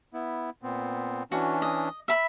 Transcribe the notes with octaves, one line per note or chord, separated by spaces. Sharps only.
B3 E4
A#2 B3 C4
E3 C#4 D4 F#4
D#5
E5 B5